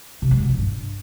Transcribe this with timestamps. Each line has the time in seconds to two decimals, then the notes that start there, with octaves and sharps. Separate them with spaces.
0.22 C3
0.31 G#3
0.40 B2
0.49 E3
0.58 G2